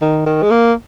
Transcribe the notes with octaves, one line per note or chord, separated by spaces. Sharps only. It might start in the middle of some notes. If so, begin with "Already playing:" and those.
D#3
D#3
G#3
A#3